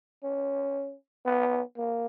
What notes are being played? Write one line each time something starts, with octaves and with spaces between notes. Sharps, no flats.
C#4
B3
A#3